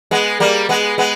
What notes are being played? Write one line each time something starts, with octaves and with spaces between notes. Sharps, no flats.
G#3 B3
G3 A#3
G#3 B3
G#3 B3